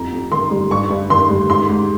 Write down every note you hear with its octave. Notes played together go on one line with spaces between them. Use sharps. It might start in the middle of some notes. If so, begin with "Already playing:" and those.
Already playing: F2 G3 A#5
F2
D#3 C6
G3
G2 C#6
G2
D#3 C6
G3
G#2 C6
G#2